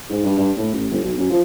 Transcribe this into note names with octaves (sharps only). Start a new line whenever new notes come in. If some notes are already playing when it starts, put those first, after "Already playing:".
G#2
G2
G2
A2
A1
G1
B1
F#2
F3